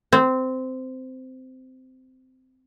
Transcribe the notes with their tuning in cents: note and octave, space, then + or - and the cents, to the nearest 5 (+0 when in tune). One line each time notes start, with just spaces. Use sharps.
C4 -15